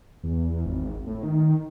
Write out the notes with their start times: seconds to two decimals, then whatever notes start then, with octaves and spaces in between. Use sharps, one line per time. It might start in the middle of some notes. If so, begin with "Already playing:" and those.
0.23 E2
0.66 G#1
1.07 A2
1.23 D#3